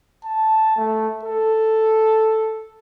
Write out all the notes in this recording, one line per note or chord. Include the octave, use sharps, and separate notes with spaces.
A5
A3
A4